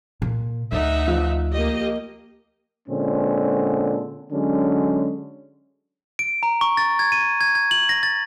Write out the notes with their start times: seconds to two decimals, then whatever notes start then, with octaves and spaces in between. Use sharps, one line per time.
0.22 A#2
0.72 D2 D#3 D#4 E5 F#5
1.08 F3
1.54 A#3 G4 D#5
2.88 A#2 D3 G#3 C4 C#4
4.32 D3 F#3 G#3 C#4
6.19 D7
6.43 A#5
6.61 C#6
6.77 A6
6.99 G#6
7.12 D#7
7.41 G#6
7.55 G#6
7.71 F#7
7.89 A#6
8.03 A6